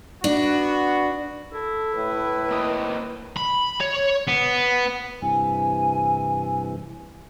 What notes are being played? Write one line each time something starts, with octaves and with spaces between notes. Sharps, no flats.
B3 D4 F#4
E4 A4
A2 B4
A#3 C4 D#5
B5
C#5
B3
G2 C3 E3 G#5